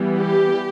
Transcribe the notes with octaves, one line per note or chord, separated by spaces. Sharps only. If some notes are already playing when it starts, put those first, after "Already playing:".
Already playing: E3 G3 B3
G4